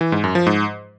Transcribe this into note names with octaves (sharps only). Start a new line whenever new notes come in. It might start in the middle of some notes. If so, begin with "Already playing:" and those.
E3
G#2
F#2
F3
G#2